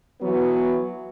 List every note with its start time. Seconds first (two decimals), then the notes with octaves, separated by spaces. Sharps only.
0.21 E3 F#3 B3